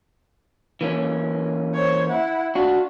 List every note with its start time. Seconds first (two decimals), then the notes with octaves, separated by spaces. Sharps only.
0.81 E3 A#3 C#4
1.74 C5 C#5
2.09 E4 F#5
2.55 D4 F4 F#4